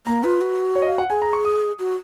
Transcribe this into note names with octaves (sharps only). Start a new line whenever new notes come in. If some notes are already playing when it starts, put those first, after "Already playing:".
A#3 A#5
F4 B4
F#4
C#5
D#5
F5
F#5
G#4 G#5
A#5
C#6
D#6
F#4